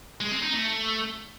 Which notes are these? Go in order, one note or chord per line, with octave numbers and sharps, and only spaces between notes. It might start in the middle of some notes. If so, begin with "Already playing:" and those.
G#3
C4
D#4
A3